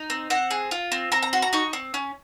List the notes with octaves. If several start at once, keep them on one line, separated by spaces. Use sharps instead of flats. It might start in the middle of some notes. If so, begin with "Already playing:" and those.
Already playing: D#4
C4
C4 F#5
G#4
F4
C4
C4 A#5
A#5
F#4 C6
A#5
D#4 C#6
C4
C#4